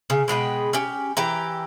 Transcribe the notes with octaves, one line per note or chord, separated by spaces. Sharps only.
C#3
B2 G#3 B4 G5
C#4 G4
E3 G4 A#5